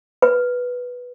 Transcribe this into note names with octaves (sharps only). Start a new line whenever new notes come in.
B4